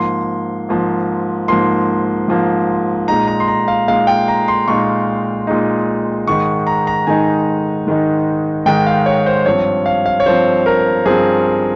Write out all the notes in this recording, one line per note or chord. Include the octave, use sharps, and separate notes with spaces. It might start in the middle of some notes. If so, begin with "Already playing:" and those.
Already playing: G#2 F3 A#3 C6
G#2 F3 A#3
G#2 F3 A#3 C6
G#2 F3 A#3
A#2 G#3 D#4 A#5
A#5
C6
A#5
F5
A#2 G#3 D#4 F5
G5
A#5
C6
A#2 G#3 D#4 C#6
A#2 G#3 D#4
G#2 D#3 G#3 D#4 C#6
A#5
A#5
G#2 D#3 G#3 D#4 G#5
G#2 D#3 G#3 D#4
G#2 D#3 G#3 D#4 G5
F5
C#5
C5
G2 F3 C4 C#5
F5
F5
C#5
G2 F3 C4 C5
A#4
G2 F3 C4 G#4